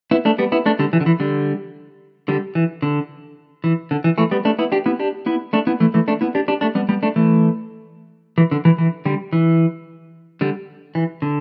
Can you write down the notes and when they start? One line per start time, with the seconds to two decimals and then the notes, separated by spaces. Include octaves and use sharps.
0.11 B3 E4
0.25 A3 D4
0.38 G3 B3
0.52 B3 E4
0.66 A3 D4
0.79 D3 G3
0.93 E3
1.01 D3
1.06 E3
1.20 D3 G3
2.28 D3 G3
2.55 E3
2.82 D3
3.64 E3
3.91 D3
4.04 E3
4.18 E3 A3
4.31 G3 B3
4.45 A3 D4
4.59 B3 E4
4.72 D4 G4
4.86 B3 E4
4.99 D4 G4
5.26 B3 E4
5.53 A3 D4
5.67 B3 E4
5.80 E3 A3
5.94 E3 A3
6.08 A3 D4
6.21 B3 E4
6.35 D4 G4
6.48 D4 G4
6.61 A3 D4
6.75 G3 B3
6.89 G3 B3
7.03 A3 D4
7.16 E3 A3
8.38 E3
8.51 D3
8.65 E3
8.78 E3
9.05 D3 G3
9.33 E3
10.41 D3 G3
10.95 E3
11.22 D3